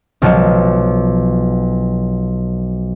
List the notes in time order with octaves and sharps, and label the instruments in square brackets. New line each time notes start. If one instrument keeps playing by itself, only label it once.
[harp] B1 F3 F#3